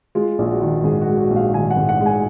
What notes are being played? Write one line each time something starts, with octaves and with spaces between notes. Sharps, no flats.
G#3 F4
A#1
F#4
D#3
G#2 G#4
F#4
G#3
F#4
A#1
F5
D#3 G#5
F#5
G#2
F#5
G#3
G#5